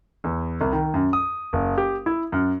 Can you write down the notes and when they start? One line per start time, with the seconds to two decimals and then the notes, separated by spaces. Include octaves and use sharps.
0.24 E2
0.61 C2
0.72 D#3
0.94 F#2
1.13 D#6
1.53 F#1
1.78 G4
2.06 E4
2.32 F#2